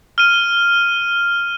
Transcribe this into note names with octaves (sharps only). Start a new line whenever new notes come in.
F6 D#7